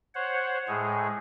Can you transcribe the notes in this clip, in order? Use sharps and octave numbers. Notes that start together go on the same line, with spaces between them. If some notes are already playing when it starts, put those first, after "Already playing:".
C5 C#5 F#5
A2 G#3 G#4